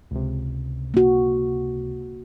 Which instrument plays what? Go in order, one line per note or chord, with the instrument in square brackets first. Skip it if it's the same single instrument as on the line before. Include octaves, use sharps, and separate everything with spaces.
[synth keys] C#2 C3
[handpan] A#3 F#4